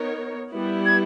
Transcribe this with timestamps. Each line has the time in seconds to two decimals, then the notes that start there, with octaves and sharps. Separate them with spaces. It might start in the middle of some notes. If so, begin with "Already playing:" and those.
Already playing: B3 D#4 A#4 C#5
0.52 G3 B3 E4
0.86 G#6